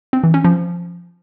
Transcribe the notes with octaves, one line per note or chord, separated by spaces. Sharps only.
C4
E3
C#4
F3